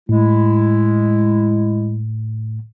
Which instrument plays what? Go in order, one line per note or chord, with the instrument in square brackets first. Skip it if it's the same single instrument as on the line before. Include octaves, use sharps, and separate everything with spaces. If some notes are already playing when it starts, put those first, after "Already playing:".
[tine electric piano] A2 [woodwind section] G#3 E4